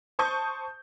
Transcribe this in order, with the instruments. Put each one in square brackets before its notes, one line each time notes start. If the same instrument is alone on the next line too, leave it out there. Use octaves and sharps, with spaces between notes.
[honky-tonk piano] C5 A5 C#6 D#6 G6